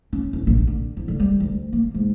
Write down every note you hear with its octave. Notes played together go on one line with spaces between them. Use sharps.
C#4
D1
A#1
D3
D1
D3
G3
D2
A#3
G#2